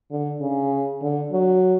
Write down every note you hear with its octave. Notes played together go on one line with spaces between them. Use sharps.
D3
C#3
D3
F#3